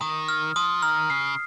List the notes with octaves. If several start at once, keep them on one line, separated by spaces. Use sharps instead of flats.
D#3 D#6
F6
F3 D#6
D#3 F6
C#3 C7